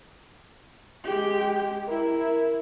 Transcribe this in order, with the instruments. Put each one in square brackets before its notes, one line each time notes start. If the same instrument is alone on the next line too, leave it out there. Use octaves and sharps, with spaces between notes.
[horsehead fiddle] G#3 G4
[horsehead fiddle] E4 [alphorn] A#4